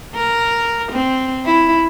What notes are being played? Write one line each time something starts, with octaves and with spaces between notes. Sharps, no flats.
A#4
C4
E4